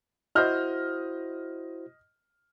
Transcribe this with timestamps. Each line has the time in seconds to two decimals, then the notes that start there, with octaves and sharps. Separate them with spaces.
0.35 E4 F#4 C5 D#5 F6 G6